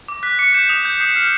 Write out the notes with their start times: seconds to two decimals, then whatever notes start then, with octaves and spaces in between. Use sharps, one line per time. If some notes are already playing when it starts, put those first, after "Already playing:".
0.08 D6
0.23 F#6 B6
0.39 D6 C#7
0.54 G6 E7
0.69 D#6 F7
0.85 G6
1.00 D#6 C7
1.16 F6 C7